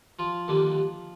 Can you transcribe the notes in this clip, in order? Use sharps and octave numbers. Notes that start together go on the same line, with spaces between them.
F3 F4
D#2 D3 G3 A#3